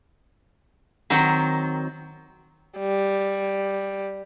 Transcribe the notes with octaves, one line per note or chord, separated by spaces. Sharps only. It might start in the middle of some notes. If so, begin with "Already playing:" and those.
D#3 F#3 C4
G3